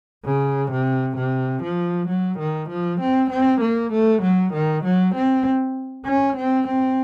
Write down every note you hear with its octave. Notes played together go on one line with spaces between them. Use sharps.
C#3
C3
C3
F3
F#3
D#3
F3
C4
C4
A#3
A3
F#3
D#3
F#3
C4
C#4
C4
C4